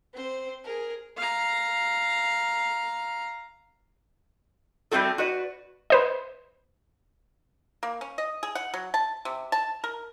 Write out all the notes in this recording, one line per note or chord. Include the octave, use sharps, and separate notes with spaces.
C4 C5
G#4 A#4
F5 A#5
G3 A3 C4 F#4 A4
F#4 B4 D5
B4 C5 D#5
A#3
C#4
D#5
G#4
F#5
F#3
A5
C3
A5
A#4